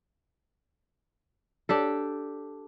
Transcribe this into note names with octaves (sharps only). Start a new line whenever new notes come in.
D4 G4 A4